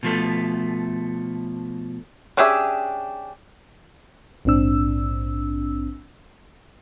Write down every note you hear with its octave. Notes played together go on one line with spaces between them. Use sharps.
B2 F3 A3
C#4 D4 G4 G#4 E5
A#1 G#2 C4 D4 E6